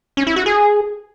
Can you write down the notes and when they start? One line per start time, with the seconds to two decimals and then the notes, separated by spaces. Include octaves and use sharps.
0.17 C#4
0.27 E4
0.36 F#4
0.46 G#4